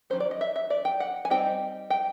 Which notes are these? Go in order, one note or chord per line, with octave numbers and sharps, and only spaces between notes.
D#3 F#3 A#3 C#4 C5
D5
D#5
E5
E5
D5
G5
F#5
G#5
G3 C4 D#4 G5
G5